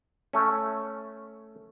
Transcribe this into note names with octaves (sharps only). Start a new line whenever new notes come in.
A3 C#4